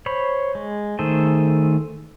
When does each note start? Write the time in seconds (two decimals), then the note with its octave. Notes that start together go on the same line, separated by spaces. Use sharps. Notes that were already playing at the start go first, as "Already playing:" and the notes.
0.06 C5 C#5 B5
0.55 G#3
0.99 D#3 A3 G#4 A4 C5